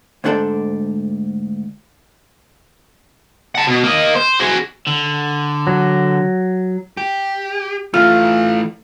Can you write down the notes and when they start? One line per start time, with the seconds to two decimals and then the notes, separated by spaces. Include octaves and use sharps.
0.24 D2 G#2 D4 A4 C5 D5
3.55 F#5 A5
3.67 B2
3.84 A#3 D#5
4.15 C5
4.40 F#4 G#4
4.87 D3
5.67 F#3
6.97 G4
7.94 E3 A3 F4